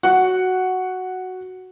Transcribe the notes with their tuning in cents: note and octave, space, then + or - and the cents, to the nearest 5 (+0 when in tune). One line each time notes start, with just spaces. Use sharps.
F#4 +0 F#5 +0